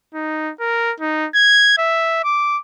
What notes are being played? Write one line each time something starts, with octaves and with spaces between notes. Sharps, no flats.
D#4
A#4
D#4
G#6
E5
D6